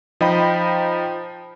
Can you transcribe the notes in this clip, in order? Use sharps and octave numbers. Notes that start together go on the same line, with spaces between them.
F3 D#4 D#5 G5 B5